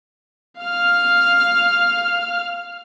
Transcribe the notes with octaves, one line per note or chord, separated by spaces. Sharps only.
F5 F6